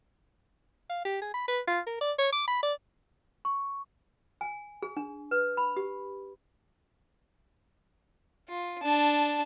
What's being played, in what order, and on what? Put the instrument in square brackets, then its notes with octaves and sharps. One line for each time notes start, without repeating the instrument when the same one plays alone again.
[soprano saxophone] F5
G4
G#4
B5
B4
F4
A#4
D5
C#5
D6
B5
D5
[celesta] C#6
[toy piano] G#5
G#4
D4
B4
B5
G4
[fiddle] F4
D4 A5